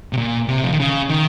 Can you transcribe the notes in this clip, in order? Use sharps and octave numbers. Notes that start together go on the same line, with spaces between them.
C3
A#2
C3
F3
D#3
C#3
D#3